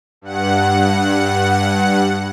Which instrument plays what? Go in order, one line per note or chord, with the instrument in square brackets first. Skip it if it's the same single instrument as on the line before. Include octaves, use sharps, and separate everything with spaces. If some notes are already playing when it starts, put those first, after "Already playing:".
[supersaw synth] G2 F#5